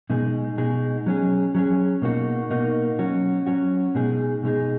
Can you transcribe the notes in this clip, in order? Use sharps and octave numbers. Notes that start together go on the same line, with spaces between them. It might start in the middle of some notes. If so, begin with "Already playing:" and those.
B2 G#3 D#4 G#4
B2 G#3 D#4 G#4
F#3 C#4 G#4
F#3 C#4 G#4
B2 A#3 D#4 F#4
B2 A#3 D#4 F#4
F#3 C#4 F#4
F#3 C#4 F#4
B2 G#3 D#4 G#4
B2 G#3 D#4 G#4